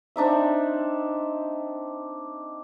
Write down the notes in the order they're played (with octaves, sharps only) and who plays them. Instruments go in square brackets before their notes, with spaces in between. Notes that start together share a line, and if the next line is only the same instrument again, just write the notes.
[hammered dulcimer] C4 D4 D#4 E5